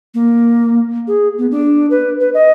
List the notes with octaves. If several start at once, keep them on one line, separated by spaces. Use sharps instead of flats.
A#3
G#4
B3
D4
B4
B4
D#5